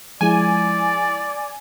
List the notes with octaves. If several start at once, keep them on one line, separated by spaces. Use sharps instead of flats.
F3 G#3 E4 D5 G#5